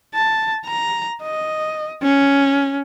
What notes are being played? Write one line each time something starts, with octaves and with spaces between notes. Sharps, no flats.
A5
A#5
D#5
C#4